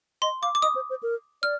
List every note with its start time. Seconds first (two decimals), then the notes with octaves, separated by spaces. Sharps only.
0.22 D#5 C6
0.42 F5 D6
0.55 D6
0.62 D#5 D#6
0.75 C5
0.90 C5
1.03 A#4
1.43 D5 F6